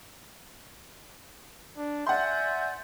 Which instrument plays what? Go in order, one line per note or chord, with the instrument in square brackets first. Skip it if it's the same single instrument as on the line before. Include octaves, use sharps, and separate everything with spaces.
[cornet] D4
[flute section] D5 G#5 G6 [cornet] E5 [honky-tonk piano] F#5 C6